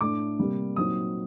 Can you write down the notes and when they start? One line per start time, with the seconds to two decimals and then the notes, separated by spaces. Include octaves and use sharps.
0.01 A2 A3 D4 D6
0.38 C3 G3 A#3
0.76 A#2 F#3 C4 D#4 D#6